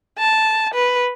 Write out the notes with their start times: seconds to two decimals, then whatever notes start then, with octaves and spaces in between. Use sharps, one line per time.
0.18 A5
0.74 B4